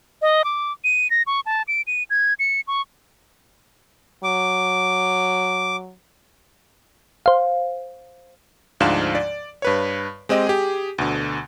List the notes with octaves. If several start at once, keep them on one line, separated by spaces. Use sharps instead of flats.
D#5
D6
D#7
A#6
C#6
A5
D7
D#7
G#6
C#7
C#6
F#3 D6
C5 F5
D2 G#2 F3 D4 F5 E7
D5
G2 B4 C#5
G#3 C4 G4 D#5
G4 G#4
D2 B2 D3